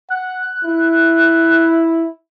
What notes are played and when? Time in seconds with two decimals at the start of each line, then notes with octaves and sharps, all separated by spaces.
0.10 F#5 F#6
0.65 E4